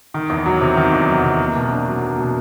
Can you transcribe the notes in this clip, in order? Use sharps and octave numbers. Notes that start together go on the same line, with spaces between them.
D#3
E2
F#3
C3
D#3
E2
F#3
C3
A#3
B2
D4
F#3
A#3
B2